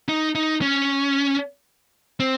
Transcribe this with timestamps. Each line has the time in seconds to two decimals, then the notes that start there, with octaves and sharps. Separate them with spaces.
0.09 D#4
0.35 D#4
0.62 C#4
2.20 C4